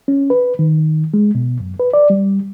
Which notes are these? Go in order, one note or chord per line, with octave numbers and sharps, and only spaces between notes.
C#4
B4
D#3
G#3
B2
F#2
B4
D5
G3